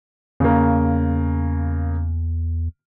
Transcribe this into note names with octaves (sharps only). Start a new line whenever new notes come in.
E2 C#3 A#3